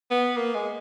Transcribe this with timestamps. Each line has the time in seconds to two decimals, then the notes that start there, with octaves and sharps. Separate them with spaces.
0.11 B3
0.37 A#3
0.55 G#3